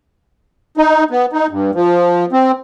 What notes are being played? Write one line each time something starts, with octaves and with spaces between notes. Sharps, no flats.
D#4
B3
D#4
G2
F3
C4